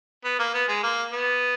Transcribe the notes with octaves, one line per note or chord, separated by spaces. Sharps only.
B3
A#3
B3
G#3
A#3
B3